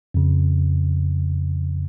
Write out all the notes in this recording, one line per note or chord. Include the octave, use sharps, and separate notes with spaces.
F2 C#3